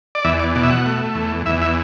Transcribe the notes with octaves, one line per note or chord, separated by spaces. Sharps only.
D5
E2 E5
D5
B2 D5
E5
F#5
A3
E2
E2 E5
E5